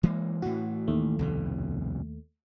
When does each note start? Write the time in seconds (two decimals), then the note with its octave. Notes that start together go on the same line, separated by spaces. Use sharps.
0.03 E3 G#3 A#3
0.42 A2 E3 F#4
0.88 D#2 A3
1.19 C2 F2 B2